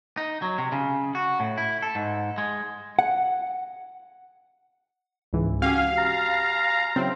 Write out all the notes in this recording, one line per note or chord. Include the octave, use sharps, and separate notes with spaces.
D#4
F#3
C3
C#3
F#4
A2
E4
A4
G#2
G#3
F#5
C#2 G#2 E3
C#4 F#4 G4 F5
A#5
C#3 F#3 C4 E4